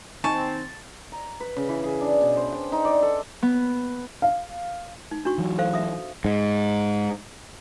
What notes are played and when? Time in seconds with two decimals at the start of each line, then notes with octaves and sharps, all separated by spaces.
0.24 D#2 C4 D#4 G#5 A5 C#6
1.12 A#5
1.40 B4
1.57 C#3
1.69 E3
1.84 G#4
2.01 D4
2.21 B2
2.37 C5
2.52 G5
2.72 D#4
2.85 D5
3.02 A4
3.43 B3
4.22 F5
5.11 D#4
5.25 D4 F#4 C#6
5.38 E3 F#3
5.58 A4 C5 F5
5.74 E5 D#6
6.25 G#2